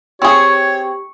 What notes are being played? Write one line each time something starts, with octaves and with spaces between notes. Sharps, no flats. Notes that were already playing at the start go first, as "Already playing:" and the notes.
C4 G4 G#4 C#5 C#6